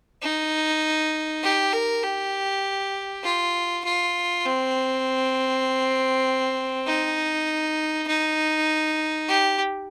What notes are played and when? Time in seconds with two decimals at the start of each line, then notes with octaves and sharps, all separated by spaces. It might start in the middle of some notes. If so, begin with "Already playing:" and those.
0.23 D#4
1.43 G4
1.73 A#4
2.03 G4
3.24 F4
3.85 F4
4.45 C4
6.86 D#4
8.07 D#4
9.29 G4